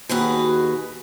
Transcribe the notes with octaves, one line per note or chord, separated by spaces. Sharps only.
D#2 B2 F#4 G#4 B4